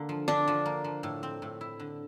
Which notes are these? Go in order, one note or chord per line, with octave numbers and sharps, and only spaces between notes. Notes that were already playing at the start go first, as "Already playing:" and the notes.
Already playing: D3 A#3
F3
D3 D4
F3
A#3
F3
A2
C4
A2
E4
D3